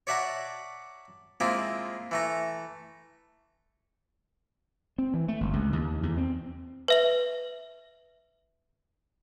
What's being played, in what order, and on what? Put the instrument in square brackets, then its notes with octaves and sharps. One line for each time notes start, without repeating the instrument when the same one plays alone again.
[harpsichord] C#5 D5 E5 F#5 A5 A#5
G#3 A#3 C4 E4 F4
E3 A3 A#5
[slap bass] C4
E3
A3
G1
C#2
D#2
E2
C4
[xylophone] B4 E5 F#7